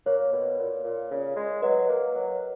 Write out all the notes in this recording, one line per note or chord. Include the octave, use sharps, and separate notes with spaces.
A#3 C#5
B2
A#2
A#2
C#3
G#3
F#3 B4 D#5
A#3
F#3